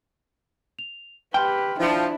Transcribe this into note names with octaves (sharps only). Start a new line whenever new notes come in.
F7
G4 B4 G5 C6 F6
F3 D4 E4 C5 D5 A5